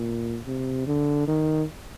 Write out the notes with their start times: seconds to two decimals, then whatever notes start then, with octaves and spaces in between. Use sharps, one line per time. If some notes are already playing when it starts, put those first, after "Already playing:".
Already playing: A#2
0.47 C3
0.87 D3
1.27 D#3